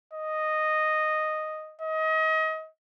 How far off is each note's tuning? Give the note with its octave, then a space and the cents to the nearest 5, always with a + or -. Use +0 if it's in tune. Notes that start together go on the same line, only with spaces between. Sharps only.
D#5 -5
D#5 +30